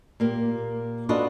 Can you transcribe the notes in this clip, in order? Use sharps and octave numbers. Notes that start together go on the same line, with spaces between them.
A#2 A#3 G4
D4 F4 F#4 A4 B4 D#5